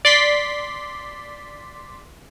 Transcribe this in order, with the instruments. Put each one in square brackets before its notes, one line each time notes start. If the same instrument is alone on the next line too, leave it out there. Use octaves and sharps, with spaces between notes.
[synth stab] D5 C6 B6